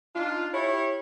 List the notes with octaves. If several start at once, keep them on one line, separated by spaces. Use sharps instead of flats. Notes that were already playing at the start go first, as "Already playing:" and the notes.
D4 D#4 F4
E4 G4 C#5